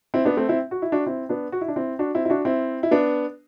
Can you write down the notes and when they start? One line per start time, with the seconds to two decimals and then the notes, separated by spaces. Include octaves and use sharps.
0.14 C4 E4
0.25 B3 D4
0.37 A3 C4
0.49 C4 E4
0.71 F#4
0.82 E4
0.92 D4 F#4
1.06 C4 E4
1.29 B3 D4
1.52 F#4
1.61 E4
1.68 D4
1.76 C4 E4
1.99 D4 F#4
2.15 C4 E4
2.25 E4
2.30 D4 F#4
2.45 C4 E4
2.83 E4
2.91 B3 D4